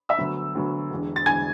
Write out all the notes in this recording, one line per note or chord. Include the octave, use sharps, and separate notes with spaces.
E5 E6
D2 D3 F#3 B3
D2 D3 F#3 B3
E1 E2 D3
A6
E1 E2 D3 G#5 G#6